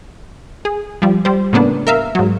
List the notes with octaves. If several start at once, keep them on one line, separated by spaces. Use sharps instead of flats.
G#4
F3 G3
G3 C5
A2 C#3 A#3 B3 D4
A#4 E5 F5
G#2 F#3